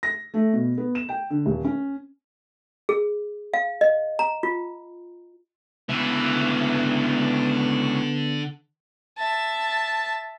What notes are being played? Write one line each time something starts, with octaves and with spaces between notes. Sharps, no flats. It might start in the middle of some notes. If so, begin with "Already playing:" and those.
A#6
A3
B2
B3
E7
G5
D3
D#1
C#4
G#4
F5
D#5
A#5
F4
C#2 D3 E3 B3 E5
E5 A5